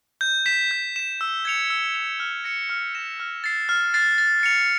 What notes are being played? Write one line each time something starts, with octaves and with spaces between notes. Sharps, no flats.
G6
B6 E7
G6
B6 E7
E6
G#6 C#7 F7
E6
G#6 C#7 F7
F6
A#6 C#7 E7
F6
A#6 C#7 E7
F6
A6 C7
F6
A6 C7
A6
C#7 F7